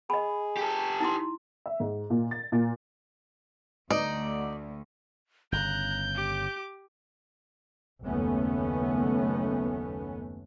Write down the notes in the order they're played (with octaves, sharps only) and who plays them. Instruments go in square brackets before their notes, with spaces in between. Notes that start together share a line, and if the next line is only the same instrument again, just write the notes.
[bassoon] G#4 [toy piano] D#5 B5
[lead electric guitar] G4 A4
[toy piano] D#4 E4 C6
[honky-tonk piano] E5
G#2
A#2
A6
A#2
[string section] D2 [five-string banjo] D#4 [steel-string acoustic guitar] D5
[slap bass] G1 C#3 [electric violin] A#5 F#6 [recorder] G6
[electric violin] G4 D6
[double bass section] F#1 D#2 A3 B3 C#4